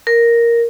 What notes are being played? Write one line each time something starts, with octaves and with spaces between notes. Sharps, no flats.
A#4